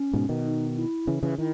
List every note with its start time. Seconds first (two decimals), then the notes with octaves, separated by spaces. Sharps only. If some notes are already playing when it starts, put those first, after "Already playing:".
Already playing: C#4
0.13 G#2 B2
0.29 B2 D#3
0.45 D#4
0.76 E4
1.07 C#3 E3
1.23 C#3 E3
1.38 D#3 E4